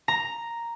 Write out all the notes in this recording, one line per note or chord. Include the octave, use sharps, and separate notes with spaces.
A#5